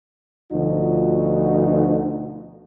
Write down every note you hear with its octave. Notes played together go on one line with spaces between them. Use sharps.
D2 B2 F3 D#4 F4 F#4